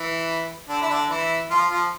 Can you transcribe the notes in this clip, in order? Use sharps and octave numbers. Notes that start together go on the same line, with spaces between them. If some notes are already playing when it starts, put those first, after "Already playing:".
Already playing: E3 E4
D3 D4
E4
D3 D4
E3 E4
F3 F4
F3 F4